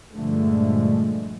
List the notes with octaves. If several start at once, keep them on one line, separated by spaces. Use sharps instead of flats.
G2 A#2 D3 F3 G#3 A3